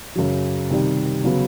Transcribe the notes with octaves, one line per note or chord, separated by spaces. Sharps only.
F#2 C#3 F#3
C3 D#3 G3
C#3 F#3 B3